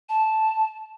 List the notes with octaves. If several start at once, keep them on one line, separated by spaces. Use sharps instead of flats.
A5